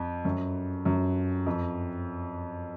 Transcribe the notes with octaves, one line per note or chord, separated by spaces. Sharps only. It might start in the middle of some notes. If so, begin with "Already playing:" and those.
Already playing: F2
F#2
F#2
F2